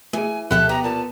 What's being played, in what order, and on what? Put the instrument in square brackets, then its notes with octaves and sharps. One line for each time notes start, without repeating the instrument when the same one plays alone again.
[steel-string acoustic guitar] E3 [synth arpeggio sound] A3 G#4 [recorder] G#5
[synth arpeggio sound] D2 B2 F3 [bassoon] A3 [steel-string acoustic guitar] G4 A4 E5 [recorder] F#6
[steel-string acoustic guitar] B3 [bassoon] G4 [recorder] A#5
[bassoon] A#2 [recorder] A5